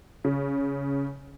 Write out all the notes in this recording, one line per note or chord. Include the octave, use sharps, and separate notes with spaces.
C#3